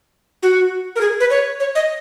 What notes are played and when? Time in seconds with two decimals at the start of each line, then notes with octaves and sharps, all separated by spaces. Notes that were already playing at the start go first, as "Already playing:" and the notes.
0.43 F#4
0.96 A#4
1.01 G#4
1.20 B4
1.30 C#5
1.60 C#5
1.75 D#5